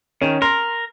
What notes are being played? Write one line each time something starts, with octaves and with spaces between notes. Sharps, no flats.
D#3 C#4
A#4 C6